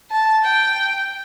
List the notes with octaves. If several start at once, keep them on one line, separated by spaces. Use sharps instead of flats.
A5
G5